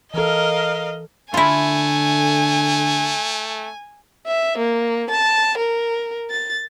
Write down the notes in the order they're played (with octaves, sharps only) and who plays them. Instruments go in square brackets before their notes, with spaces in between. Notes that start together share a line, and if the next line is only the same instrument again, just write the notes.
[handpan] E3 A4 [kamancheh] A#4 F5 [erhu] D#5
[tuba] D3 [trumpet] A3 [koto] E4 F4 [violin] G#5
[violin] E5
A#3
A5
A#4
A6